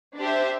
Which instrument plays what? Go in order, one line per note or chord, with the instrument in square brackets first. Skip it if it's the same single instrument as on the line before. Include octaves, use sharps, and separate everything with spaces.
[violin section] D4 G4 C5 E5